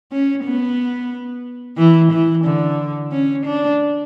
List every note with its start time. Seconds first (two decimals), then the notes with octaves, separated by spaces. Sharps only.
0.12 C#4
0.45 B3
1.78 E3
2.12 E3
2.45 D3
3.12 C#4
3.45 D4